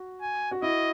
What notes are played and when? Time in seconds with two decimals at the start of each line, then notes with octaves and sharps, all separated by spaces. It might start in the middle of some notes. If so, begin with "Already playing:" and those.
Already playing: F#4
0.22 G#5
0.51 F#4
0.62 E4 D#5